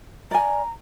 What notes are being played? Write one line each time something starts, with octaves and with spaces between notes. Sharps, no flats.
D5 G#5 A#5